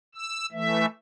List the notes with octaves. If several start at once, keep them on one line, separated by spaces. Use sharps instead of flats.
E6
E3 A3 E5